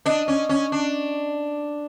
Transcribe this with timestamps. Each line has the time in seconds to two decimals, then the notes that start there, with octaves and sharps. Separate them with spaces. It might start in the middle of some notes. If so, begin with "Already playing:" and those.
0.06 D4 D#5
0.28 C#4
0.49 C#4
0.72 D4